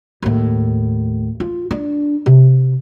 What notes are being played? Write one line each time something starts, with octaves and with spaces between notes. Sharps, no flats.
D#2 A2
F4
D4
C3